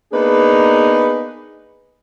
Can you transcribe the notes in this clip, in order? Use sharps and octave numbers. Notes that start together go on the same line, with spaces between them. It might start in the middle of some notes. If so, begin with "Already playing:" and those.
A#3 B3 D4 D#4 G#4 B4